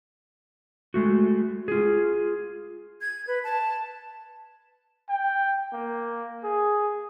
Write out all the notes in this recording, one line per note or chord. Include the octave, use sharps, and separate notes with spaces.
G#3 A3 F#4
F4 G#4
G#6
B4
A5
G5
A#3
G#4